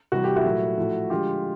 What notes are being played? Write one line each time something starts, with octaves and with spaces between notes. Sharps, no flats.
C3 E3 G3 F#4
G4
E4 F#4
A#2 F#3 A3
A2 F3 A3
D3 F3 G#3 F4 G4